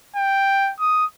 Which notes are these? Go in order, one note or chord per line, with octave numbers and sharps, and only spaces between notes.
G5
D#6